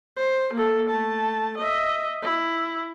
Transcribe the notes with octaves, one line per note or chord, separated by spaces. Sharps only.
C5
A#3 A4
A3 A5
D#5 E5
E4